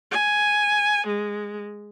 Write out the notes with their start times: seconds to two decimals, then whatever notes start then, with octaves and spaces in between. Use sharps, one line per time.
0.12 G#5
1.07 G#3